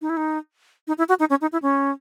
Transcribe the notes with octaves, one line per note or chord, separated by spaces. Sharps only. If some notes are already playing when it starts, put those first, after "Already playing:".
D#4
E4
D#4
D#4
E4
F#4
D#4
C#4
D#4
E4
C#4